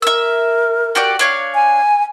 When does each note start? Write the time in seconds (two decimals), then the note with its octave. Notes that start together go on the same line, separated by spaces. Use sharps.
0.02 A#4 E5 E6
0.95 F#4 G4 D5
1.19 D4 C#5 F5
1.55 G#5